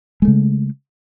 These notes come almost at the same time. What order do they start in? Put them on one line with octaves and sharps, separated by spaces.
G#3 A3 C#3